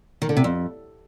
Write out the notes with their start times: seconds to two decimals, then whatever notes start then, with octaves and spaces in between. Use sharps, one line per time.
0.22 D#3
0.29 D3
0.37 C3
0.44 F2